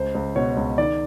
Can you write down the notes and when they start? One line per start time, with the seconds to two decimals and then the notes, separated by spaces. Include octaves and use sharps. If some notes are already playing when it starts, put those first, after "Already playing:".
Already playing: C#2 C5
0.15 C#2
0.36 B2 C#5
0.57 C#2
0.78 D#3 D5